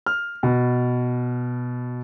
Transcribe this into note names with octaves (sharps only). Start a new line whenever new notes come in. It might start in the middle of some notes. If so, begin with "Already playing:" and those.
F6
B2